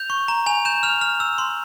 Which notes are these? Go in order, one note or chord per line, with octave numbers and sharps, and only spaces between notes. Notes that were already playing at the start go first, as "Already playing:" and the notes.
Already playing: G6 F7
C#6
A#5
G#5 F7
G6 E7
F6 F7
F6
E6
C6